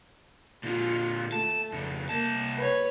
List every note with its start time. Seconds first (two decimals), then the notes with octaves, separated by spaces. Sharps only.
0.64 A#2 D3 F4
1.32 A3 A5
1.72 F2 C#3
2.09 C2 A#3 A5
2.58 B4 C#5